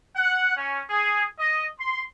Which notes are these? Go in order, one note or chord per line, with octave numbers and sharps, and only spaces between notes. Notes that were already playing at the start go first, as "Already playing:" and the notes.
F#5
C#4
G#4
D#5
C6